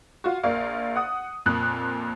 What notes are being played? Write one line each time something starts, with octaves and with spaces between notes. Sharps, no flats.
F4 F#4
A#1 A#3 D5 F5
F#5 D#6
F2 A#2 F#6